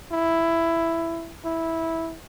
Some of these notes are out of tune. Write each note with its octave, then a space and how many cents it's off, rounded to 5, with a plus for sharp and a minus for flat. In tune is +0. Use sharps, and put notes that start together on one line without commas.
E4 +10
E4 -10